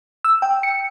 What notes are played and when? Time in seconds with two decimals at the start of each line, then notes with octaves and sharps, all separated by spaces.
0.24 E6
0.42 G5
0.63 C#7